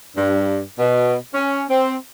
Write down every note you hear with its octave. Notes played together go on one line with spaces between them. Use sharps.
G2
B2
C#4
C4